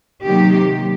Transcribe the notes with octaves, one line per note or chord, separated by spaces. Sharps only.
C3 D#3 F#3 A#3 G4